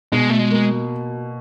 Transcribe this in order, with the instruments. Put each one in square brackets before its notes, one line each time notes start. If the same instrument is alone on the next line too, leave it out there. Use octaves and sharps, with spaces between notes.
[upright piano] B2 [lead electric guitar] G#3
[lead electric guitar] A3
G#3
[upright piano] A#3